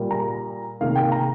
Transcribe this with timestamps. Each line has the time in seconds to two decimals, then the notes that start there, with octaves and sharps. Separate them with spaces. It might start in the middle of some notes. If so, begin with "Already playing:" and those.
Already playing: A#2 G3 A#3
0.11 A#5
0.80 C3 D#3 A#3 F5
0.96 G5
1.12 A#5